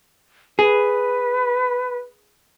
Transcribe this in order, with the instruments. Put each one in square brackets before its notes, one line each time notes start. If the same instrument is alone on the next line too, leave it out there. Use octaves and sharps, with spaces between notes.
[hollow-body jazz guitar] G#4 [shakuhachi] B4